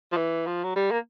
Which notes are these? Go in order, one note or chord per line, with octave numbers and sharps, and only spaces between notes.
F3
E3
F3
F#3
G3
A#3